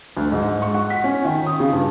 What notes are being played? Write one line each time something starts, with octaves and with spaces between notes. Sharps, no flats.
D2
G#2
C#6
F#5
B6
C#4
D#3
D#6
C#3
G2